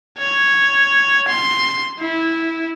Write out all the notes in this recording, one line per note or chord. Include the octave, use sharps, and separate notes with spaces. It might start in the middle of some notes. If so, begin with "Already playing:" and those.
C#5
C6
E4